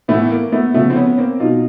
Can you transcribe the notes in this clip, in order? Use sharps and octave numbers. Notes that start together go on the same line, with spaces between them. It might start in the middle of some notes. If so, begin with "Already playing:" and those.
A2 E3 A3 B3
A#3
A3 B3
C#3 F3 A3 B3
C4
B3 C#4
A#3 C4
B2 F#3 D#4 F4